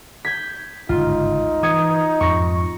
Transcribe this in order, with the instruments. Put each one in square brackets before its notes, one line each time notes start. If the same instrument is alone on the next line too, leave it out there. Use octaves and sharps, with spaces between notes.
[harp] G6 G#6 B6
[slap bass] G1 C#2 G#2 [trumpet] D#4 [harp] F4
[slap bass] E3 [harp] D#6 G#6 C#7
[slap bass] F2 G#2 [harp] C#6 A#6 C#7